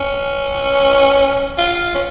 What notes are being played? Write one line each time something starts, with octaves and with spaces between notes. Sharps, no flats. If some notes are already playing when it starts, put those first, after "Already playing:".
Already playing: C#4
F4
C#4